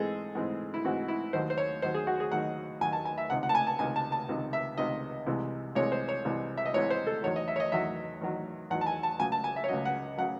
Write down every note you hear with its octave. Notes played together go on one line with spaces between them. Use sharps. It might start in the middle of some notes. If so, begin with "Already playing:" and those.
Already playing: G#2 E3 G#3 C4 G#4 A4
G#2 E3 G#3 C4
E4
G#2 E3 G#3 C4 F#4
E4
D#2 D#3 F#3 C5
C5
C#5
D#2 D#3 F#3 C5
G#4
F#4
G#4
D#2 D#3 F#3 F#5
D#2 D#3 F#3 G#5
A5
G#5
E5
C#2 C3 D#3 F#5
F#5
A5
G#5
A5
C#2 C3 D#3 G#5
A5
A5
C#2 C3 D#3
E5
C#2 C3 D#3 D#5
C2 C3 E3 G#3
C2 C3 E3 G#3 C#5
C5
C#5
C2 C3 E3 G#3
E5
D#5
C2 C3 E3 G#3 C#5
C5
A4
E2 D#3 F#3 C#5
D#5
E5
C#5
D#5
E2 D#3 F#3 E5
E2 D#3 F#3
E2 D#3 F#3 F#5
A5
G#5
A5
C#2 C#3 F#3 G#5
A5
G#5
E5
C#5
C#2 C#3 F#3 D#5
F#5
C#3 F#3 F#5